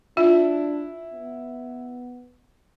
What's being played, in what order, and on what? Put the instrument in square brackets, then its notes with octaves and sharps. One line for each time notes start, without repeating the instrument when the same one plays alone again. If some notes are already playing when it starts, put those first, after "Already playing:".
[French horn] D4 [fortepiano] E4 [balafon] F4
[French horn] B3